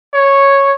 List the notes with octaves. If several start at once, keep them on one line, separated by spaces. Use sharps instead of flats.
C#5